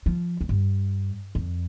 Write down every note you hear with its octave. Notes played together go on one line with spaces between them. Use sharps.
F3
F2
G2
F2